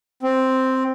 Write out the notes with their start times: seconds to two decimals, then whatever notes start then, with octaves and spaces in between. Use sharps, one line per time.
0.23 C4